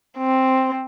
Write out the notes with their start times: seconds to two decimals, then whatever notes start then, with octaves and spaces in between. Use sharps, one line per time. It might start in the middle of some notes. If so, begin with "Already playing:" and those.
0.18 C4